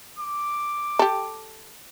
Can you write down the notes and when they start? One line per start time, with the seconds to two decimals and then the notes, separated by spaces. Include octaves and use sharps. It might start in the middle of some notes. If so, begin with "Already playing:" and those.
0.19 D6
0.99 G4 A4